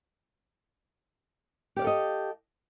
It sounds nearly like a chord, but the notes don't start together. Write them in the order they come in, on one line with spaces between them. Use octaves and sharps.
G4 D5 F5 A4 D#5